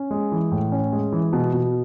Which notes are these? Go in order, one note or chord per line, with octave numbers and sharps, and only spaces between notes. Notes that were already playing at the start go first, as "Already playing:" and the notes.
Already playing: C#4
G#3
E3
A2
C#4
G#3
E3
B2
B2